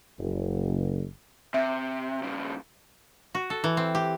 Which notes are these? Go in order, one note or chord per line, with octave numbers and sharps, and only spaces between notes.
F#1
C3 E5
G2 C#3
F#4
A4
E3
C4
G4